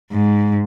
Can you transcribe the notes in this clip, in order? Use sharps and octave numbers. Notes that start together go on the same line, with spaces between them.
G#2